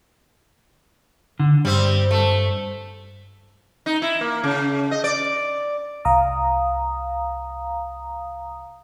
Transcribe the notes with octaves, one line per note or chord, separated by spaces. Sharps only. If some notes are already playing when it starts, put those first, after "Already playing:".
D3
G2 G3 C4
A3
D#4
E4
A#3
C#3
D#5
D5
C2 F5 A#5 D#6